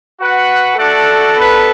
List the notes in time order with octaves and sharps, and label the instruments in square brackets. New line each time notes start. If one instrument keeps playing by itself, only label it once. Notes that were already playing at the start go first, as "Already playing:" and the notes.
[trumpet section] F#4 B4 F#5
[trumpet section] A3 D4 F#4 D5 F#5 [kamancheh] A4
[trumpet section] B3 D4 B4